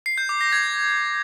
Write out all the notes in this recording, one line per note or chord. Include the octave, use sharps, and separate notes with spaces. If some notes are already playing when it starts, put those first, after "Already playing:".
C7
G6
D6
A#6
G#6